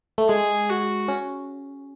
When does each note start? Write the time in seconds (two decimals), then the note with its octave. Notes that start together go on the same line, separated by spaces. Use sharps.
0.18 A3
0.29 G#3 G#4
0.69 F#4
1.08 C#4